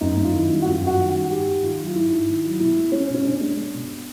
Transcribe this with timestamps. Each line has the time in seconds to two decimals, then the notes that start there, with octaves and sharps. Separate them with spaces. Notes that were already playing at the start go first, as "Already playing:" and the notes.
0.01 F#2 D#4
0.17 F#2
0.24 F4
0.33 D#3 E4
0.49 G3
0.62 F#4
0.66 F#2 F4
0.81 F#2
0.87 F#4
0.98 D#3
1.09 G3 F#4
1.30 G#2 G4
1.47 G#2
1.63 D#3 F4
1.79 F#3
1.86 F4
1.95 G#2 E4
2.11 G#2
2.28 D#3
2.44 F#3
2.60 B2 E4
2.76 G#3
2.92 G#3 C#4
3.09 B2
3.14 C#4
3.25 B2 D4
3.41 G#3
3.57 G#3
3.73 B2